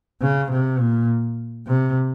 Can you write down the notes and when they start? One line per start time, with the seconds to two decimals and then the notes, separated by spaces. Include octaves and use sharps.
0.22 C#3
0.52 C3
0.80 A#2
1.67 C3